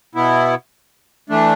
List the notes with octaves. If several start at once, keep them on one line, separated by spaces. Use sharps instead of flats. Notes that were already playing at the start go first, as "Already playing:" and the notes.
B2 B3 E4
E3 A3 D4